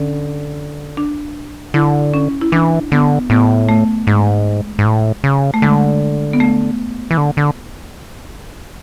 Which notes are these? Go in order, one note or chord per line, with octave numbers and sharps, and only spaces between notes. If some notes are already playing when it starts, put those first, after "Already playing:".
Already playing: D3 C#4
D4
D3 E4
C#4
E4
E3 D4
D3 B3
A2 B3
A3
G#2 G#3
G#2
A2
C#3
A3
D3 G#3
B3
A3
E3
D3
D3